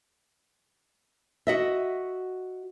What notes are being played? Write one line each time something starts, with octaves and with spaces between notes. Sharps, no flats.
F#4 D#5 E5